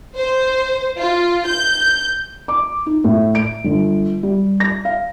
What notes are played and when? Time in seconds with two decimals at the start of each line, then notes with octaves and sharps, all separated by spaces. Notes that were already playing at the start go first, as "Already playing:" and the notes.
0.18 C5
1.00 F4
1.47 G6
2.48 D6
2.86 D#4
3.04 A2
3.35 D7
3.64 G1
4.23 G3
4.60 A#6
4.85 F5